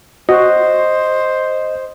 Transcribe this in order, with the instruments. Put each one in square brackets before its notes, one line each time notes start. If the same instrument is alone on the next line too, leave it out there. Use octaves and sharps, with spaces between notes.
[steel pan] F#4 [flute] C5 [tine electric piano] D#5